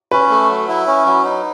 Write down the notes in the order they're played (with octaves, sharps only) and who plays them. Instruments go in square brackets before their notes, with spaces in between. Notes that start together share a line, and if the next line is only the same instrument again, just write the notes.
[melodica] C#4 [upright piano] B4
[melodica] A3
F#3
E4
C#4
F#3
D#4